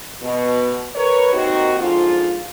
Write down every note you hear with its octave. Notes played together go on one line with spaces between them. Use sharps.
B2
A#4 B4 C#5
D#2 D#3 C4 D#4 F#4
G#2 D3 F3 F4